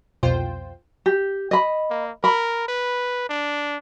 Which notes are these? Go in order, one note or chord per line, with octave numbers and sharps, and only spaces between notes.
C2 F2 B2 F4 C5 G5
G4
D#5 B5
A#3
A#4 B5
B4
D4